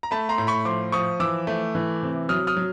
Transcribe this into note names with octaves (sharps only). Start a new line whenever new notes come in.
A#5
A3 A5 B5
A#5 C6
A2
B5 C#6
F3 C6 D6
F3 C#6 D#6
E3 D6 E6
A3
E3
C3
F#3 D#6 F6
D#6 F6
F#3